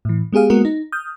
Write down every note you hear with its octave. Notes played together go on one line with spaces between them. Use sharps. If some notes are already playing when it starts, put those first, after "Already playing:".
A2 E3
G#3 B3 G4 G#4 F5
G#3 A#3 B3 F#4 A#4
D#4
D#6 F6 G6